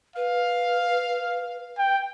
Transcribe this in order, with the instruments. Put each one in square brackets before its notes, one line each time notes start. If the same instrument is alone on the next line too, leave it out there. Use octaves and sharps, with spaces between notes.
[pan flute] B4 [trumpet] F5
[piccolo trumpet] G5